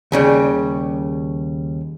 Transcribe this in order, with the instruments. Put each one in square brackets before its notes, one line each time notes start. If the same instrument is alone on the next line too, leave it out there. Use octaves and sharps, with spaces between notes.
[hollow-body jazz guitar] D#2 C#3 G3